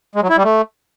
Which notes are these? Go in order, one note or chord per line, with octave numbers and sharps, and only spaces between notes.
G#3
F#3
E4
G3
A3